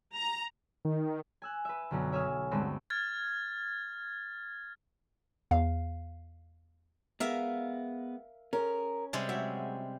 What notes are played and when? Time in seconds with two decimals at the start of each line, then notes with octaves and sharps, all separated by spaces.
0.15 A#5
0.85 D#3
1.42 G#5 E6 F#6
1.65 B4 E5
1.91 B1 F#2 D3
2.12 C#5 E5 G#5 D#6 F6
2.51 D2 G2 D3 G#3 B3 C4
2.90 F6 G#6 A6
5.51 E2 F5
7.20 G#3 B3 A#4 E5 F5
8.53 C#4 G#4 A#4
9.13 C3 G3 G#3
9.29 F#3 G#3 E5